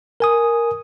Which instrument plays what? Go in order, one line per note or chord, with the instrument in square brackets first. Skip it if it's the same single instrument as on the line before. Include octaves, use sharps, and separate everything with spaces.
[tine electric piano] A#4 G#5 D#6